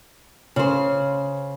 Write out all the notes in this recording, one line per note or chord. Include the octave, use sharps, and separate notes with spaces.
C#3 C5